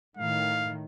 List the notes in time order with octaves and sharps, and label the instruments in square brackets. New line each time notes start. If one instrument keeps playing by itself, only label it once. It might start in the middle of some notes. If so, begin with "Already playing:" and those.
[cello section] A2 D#3 [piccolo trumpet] F5